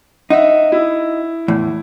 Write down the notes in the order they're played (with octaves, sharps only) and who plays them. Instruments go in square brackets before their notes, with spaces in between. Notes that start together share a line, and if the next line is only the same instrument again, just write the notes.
[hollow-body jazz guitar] D#4 [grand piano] E5 F#5
[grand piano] E4
[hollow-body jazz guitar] E2 A2